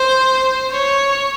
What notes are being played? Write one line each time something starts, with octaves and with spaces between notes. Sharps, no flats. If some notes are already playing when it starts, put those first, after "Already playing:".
Already playing: C5
C#5